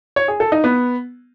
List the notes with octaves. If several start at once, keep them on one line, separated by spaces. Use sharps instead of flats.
C#5
G#4
A4
D#4
B3